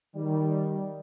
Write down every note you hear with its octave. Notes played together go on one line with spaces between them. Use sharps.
D#3 G3